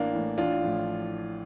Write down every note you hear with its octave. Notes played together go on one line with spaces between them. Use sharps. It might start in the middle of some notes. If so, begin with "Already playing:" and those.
Already playing: A1 A#3 D4
A2 E3
A1 D4 F4
A2 F3